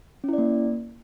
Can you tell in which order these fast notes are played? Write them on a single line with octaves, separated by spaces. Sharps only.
C#4 E4 D5 A#3